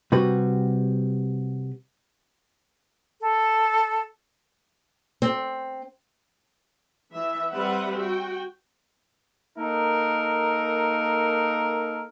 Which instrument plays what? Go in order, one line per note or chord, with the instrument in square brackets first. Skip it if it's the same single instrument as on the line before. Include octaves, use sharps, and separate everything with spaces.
[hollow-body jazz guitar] C3 G3 F#4 B4
[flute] A4
[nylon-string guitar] C4
[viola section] E3 E5
G3 C4 B4 E5 F#5
F#4 G5
[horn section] A#3 D#4 A4 A#4